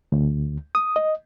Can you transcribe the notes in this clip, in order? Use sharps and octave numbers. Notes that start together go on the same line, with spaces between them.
D2
D#6
D#5